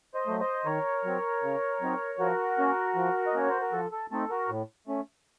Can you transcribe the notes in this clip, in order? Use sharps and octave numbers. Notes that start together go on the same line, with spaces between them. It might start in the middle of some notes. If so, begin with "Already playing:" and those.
C5 D#5
F#3 A3
C5 D#5
D#3 A#4 C#5
F#3 C4
C#3
F#3 C4 D#4
F3 F#4 A#4
A#3 C#4
F3
D#5
A#3 C#4 C#5
C5
A#4
F3 A4
A4
A3 C4 D#4 A4
F#4 A#4
A2
A3 C#4